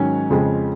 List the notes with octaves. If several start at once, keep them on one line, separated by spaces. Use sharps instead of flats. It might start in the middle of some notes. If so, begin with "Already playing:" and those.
Already playing: G#2 D#3 F#3 C#4 C#5
F2 C#3 F3 G#3